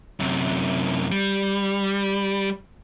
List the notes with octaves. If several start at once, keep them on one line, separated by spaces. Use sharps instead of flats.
F#2 C3
G3